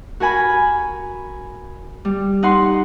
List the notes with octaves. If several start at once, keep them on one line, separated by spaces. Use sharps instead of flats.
F#4 A#4 G#5 B5
G3
D#4 F#5 C6